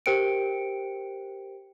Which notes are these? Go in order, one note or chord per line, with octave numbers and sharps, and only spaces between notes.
G4 A#4 C5 G5 C#7 D7